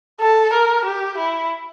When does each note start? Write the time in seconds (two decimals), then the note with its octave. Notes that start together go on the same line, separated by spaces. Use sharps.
0.20 A4
0.53 A#4
0.85 G4
1.17 E4